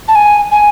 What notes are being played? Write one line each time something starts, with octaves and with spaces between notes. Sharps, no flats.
A5
G#5
G#5